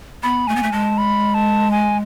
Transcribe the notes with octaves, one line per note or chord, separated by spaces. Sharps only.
B3 B5
A3 G#5
B3
A3
G#3 A5
B5
A5
G#5